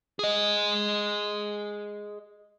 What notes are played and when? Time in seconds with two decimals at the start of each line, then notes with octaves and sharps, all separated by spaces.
0.19 G#4 D#5